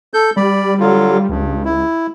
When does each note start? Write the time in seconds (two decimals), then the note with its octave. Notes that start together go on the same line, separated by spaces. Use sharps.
0.14 A4 G6
0.37 G3 D5 B5
0.80 D3 F#3 F4
1.29 C#2 G2
1.65 E4